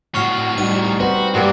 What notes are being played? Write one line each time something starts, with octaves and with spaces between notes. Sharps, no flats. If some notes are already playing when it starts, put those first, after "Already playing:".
A2 F#4 C#6 F6 C7
G3 D#4 D#7
C4 F#4 B4 C5
G2 G3 A#3 F#4